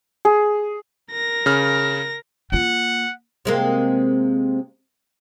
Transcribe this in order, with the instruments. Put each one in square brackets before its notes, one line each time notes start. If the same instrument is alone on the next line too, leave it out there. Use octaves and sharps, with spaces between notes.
[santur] G#4
[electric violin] A#4 A#6
[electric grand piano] C#3 F6
[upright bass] A#3 F4 [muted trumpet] F#5
[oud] C3 G#3 A#3